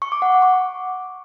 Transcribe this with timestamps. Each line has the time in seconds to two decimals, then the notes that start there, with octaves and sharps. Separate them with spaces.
0.02 C#6
0.12 D6
0.22 F#5
0.32 D6
0.42 C#6